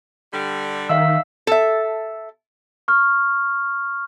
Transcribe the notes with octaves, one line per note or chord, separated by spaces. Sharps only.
D3 G3
D#3 E5 F5 E6
A4 E5
C#6 F6